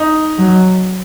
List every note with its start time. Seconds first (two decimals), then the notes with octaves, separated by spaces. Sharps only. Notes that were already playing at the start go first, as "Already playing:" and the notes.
Already playing: D#4
0.39 F#3